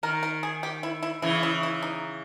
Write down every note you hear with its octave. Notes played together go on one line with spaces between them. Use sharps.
D#3 A#4
A#4
G#4
G4
E4
E4
C#3 E3 E4
E4
E4
D#4